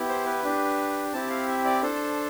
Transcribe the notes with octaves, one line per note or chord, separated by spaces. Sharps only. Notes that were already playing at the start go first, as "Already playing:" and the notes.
Already playing: B3 E4 G4
C5
B4
D4 G4
C4 E4 G4 A5
F5
E5
D5
D4 A4 C5